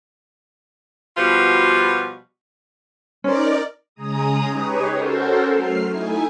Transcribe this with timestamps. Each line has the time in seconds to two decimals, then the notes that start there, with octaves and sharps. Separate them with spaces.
1.17 B2 F3 G3 F4 F#4 B4
3.24 C#4 D#4 A#4 C5 D5
3.95 C#3 G#3 G#4 A#5 D#6
4.50 D#4 G4 G#4 B4 C#5
4.92 C#4 F#4 A4 A#4 C5
5.53 F#3 A3 F6 C7
5.89 A3 D#4 E4 G#5